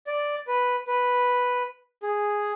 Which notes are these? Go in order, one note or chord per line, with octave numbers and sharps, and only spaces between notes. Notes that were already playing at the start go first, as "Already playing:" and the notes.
D5
B4
B4
G#4